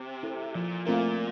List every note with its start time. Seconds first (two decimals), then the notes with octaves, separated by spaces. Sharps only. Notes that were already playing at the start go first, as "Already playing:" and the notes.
Already playing: C3
0.23 E4 A4 C5
0.54 A#2 F3
0.86 A#2 A3 C4 F4 A#4